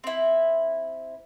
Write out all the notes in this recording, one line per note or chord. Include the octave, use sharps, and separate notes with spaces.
C4 E4